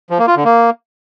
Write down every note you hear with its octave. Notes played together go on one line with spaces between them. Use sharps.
F3
A#3
F4
D3
A#3